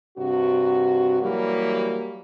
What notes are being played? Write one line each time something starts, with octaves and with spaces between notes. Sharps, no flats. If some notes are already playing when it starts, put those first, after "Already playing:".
G2 C3 F#4
E3 F#3 G3 A#3